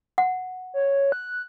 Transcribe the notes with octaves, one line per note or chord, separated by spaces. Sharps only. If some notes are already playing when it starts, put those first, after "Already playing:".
F#5
C#5
F#6